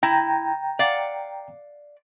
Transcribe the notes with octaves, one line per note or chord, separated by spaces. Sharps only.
E4 G5 A#5
D5 F5 F#5